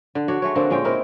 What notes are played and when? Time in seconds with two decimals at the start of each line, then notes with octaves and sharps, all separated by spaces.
0.15 D3
0.28 D4 F#4 C#5
0.42 G#3 A3 C#5
0.55 D3 A#3 C4 D4
0.70 A#2 G#3 C#4 G5
0.85 C4 D#4 E4 A#4